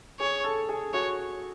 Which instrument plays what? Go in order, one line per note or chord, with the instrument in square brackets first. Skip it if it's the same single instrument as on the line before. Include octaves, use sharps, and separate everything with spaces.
[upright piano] G#4 [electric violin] C#5
[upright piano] A4
G#4
[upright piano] F#4 [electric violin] C#5